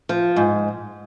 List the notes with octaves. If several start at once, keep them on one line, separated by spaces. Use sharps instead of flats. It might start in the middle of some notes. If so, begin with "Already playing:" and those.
F3
G#2